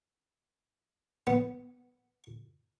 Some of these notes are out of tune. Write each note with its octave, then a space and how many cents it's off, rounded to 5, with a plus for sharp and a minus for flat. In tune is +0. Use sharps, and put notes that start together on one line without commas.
B3 +0